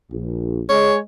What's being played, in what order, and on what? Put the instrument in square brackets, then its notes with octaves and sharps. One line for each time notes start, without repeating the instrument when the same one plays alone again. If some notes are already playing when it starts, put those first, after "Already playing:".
[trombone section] A#1
[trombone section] G#3 [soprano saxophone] C#5